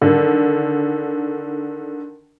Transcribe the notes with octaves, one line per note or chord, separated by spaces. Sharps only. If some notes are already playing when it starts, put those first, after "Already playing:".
D3 D#3